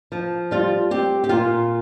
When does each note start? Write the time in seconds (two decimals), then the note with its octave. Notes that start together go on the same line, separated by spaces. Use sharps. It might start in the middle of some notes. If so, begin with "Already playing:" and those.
0.12 F3
0.51 G3 F4
0.91 C4 G4
1.24 G4
1.29 A#2 F4